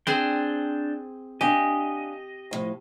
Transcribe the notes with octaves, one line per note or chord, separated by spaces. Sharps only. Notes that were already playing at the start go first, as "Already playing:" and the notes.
C4 D4 G#4 C5 G5
D4 G4 D#5 F5 G#5
D2 A2 F3